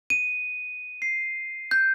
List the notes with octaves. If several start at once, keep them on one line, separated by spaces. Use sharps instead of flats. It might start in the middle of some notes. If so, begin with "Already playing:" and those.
D#7
C7
G6